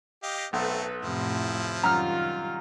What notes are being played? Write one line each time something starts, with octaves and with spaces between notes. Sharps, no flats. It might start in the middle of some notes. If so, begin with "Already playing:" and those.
G4 D#5 F5
B1 A3 C4 A4 B4
F2 A2 C3 F3 E4
F#2 D#3 G3 F4 A#5 F6